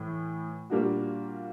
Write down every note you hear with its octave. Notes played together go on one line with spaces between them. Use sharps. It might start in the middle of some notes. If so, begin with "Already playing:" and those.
Already playing: A2 E3
A#2 G3 A#3 D4 F#4